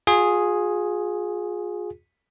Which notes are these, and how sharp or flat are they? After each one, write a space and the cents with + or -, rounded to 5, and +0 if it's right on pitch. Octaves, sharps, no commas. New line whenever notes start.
F4 +35 G#4 +0